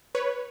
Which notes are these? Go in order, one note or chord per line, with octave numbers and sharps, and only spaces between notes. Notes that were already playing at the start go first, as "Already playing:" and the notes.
B4 C#5